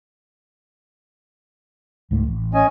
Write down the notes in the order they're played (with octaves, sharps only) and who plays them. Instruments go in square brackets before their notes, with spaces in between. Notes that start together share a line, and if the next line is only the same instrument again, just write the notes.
[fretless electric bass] C#2 G#2 A3
A1
[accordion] C#4 D#5 G#5